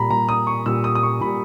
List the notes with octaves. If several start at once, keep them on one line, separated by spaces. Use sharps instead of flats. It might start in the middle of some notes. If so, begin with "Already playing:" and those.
Already playing: A#2 G3 A#5 B5
A#2 G3 A#5
D#6
C#6
A#2 G3 E6
D#6
D#6
C#6
A#2 G3 B5